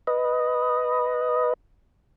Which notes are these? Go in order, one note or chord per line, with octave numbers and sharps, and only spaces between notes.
B4 D#5